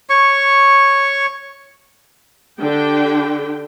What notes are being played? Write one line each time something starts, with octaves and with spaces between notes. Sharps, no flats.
C#5 C#6
D3 D4 G4 G5